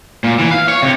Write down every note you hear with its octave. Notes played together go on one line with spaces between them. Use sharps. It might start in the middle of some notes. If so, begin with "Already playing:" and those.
A#2
E3
F5
C#5
C3